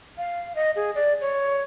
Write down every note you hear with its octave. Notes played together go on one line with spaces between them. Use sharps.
F5
D#5
G#4
D5
C#5